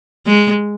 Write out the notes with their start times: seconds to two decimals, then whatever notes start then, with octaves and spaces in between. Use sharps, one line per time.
0.27 G#3